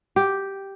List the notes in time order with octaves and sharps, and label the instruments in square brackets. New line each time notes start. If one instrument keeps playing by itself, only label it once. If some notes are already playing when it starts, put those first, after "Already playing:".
[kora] G4